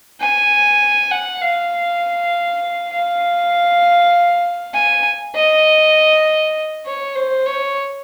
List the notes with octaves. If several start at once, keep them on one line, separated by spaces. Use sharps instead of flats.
G#5
F#5
F5
F5
G#5
D#5
C#5
C5
C#5